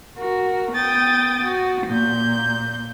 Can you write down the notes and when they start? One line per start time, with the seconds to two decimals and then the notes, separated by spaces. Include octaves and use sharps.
0.16 F#4 A#4
0.74 B3 G5 D#6 A6
1.42 F#4
1.87 A#2 A#3 G6